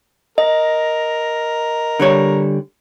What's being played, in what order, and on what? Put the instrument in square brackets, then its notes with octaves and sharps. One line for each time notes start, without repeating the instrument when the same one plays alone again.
[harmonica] A#4 [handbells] D#5
[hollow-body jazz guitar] D3 G3 C#5